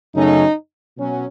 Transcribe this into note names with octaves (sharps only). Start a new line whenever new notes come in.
F#2 C#3 F#3 A3 C#4 D#4
B2 F#3 C#4